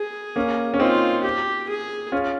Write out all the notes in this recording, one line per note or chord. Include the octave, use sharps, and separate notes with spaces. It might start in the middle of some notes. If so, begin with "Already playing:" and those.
Already playing: G#4
A#3 C#4
C#4
C4 D#4 F4
G4
G#4
C#4 F4